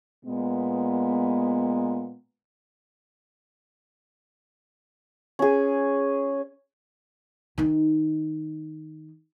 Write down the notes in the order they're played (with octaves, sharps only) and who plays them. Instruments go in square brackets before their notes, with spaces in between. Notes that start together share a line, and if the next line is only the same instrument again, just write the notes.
[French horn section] A#2 G#3 B3
[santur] C#4 G#4
[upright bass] D#3 D#4